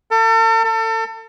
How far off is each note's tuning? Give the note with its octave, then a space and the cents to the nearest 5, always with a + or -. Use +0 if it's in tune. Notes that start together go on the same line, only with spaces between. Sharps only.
A4 +40
A4 +35